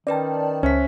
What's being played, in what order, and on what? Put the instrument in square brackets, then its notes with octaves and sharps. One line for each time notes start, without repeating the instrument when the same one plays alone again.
[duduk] D#3 [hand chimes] C#4 B4 G5 [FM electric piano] D5 A5
[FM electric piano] C#2 [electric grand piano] C#4 [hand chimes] C5 E5 B6